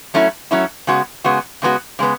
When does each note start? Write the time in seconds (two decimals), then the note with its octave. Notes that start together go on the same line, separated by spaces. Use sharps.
0.14 F#3 A3 C#4 E4
0.51 F#3 A3 C#4 E4
0.87 C#3 G#3 B3 F#4
1.24 C#3 G#3 B3 F#4
1.62 C#3 G#3 B3 F#4
1.99 C#3 G#3 B3